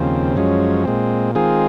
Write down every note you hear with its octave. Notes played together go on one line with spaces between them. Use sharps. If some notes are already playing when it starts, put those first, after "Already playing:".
Already playing: D#2 C#3 F3 C4
F#2 F3 G#3 C#4
A#2 G#3 C4
D#3 G#3 C4 F4 G#4